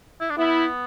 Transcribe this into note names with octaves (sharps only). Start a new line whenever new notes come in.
E4
D4
B3 E4